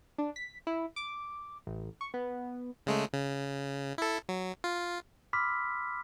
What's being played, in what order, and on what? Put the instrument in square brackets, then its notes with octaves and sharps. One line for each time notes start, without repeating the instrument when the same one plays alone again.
[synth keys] D4
B6
E4
D6
A1
C#6
B3
[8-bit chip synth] C#3 G#3 A3
C#3
E4 A4
F#3
F4
[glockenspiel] B5 C6 D6 E6 F6 B6